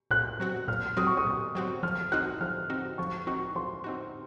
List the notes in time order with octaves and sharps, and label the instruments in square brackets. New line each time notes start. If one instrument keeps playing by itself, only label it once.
[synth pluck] A#2 [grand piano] F#6
[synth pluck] F#3 C4 F#4
[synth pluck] A#2 [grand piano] F6
[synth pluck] F#3 C4 F#4 [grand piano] D#6
[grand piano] C#6
D#6
[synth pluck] A#2
F#3 C4 F#4
[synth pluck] F3 [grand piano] F6
[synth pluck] C4 D#4 F#4 [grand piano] F#6
[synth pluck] F3 [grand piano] F6
[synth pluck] C4 D#4 F#4
[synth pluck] F3 [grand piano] C#6
[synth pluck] C4 D#4 F#4 [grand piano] C#6
[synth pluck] F3 [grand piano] C6
[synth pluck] C4 D#4 F#4